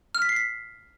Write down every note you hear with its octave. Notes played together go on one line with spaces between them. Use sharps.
F6
B6
C7
B6